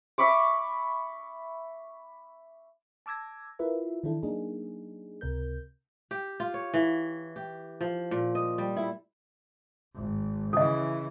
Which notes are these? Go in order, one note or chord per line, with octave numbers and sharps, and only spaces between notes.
E5 B5 C#6 D6
A5 D6 E6 G#6 A#6
E4 F4 A#4 B4 E5
D#3 E3 D4 E4 A4
F#3 A#3 D4 D#4 G#4
C#2 C3 A#4 G6
G4
F4
C#5
E3
G4
F3
A#2
D#5
G3
E4
G#1
C#3 E3 A4 D#5